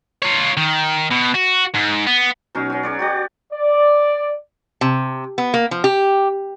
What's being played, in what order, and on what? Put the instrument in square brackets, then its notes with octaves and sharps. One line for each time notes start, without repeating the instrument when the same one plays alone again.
[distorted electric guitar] F4 C#5
D#3
B2
F#4
G#2
B3
[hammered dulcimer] B2 F#3 C#4 D#4
C#4 F#4
G#4 C#5 D5
F#4 G4 D5
[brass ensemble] D5
[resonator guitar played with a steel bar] C3
B3
A#3
F3
G4